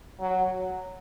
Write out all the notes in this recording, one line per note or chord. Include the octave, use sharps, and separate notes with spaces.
F#3